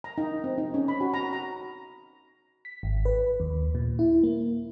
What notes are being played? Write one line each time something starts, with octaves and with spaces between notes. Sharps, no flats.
A#5
D#4
C4
D#4
C#4
B5
F#4
A#5
A#5
B6
G#1
B4
D#2
A#2
E4
A#3